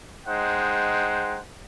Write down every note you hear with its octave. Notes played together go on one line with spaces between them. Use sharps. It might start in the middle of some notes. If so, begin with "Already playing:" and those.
G#3 D#4 C5 F#5 G5